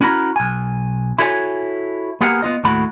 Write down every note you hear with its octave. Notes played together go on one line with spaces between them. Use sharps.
C#4 E4 F#4 A#4 B5
B1 G#5
E4 F#4 A4 C#5 D5 G#5
A#3 B3 G4 G#4 A#4 F#5
B3 F4 D#5
D#2 A2 A3 F#4 B5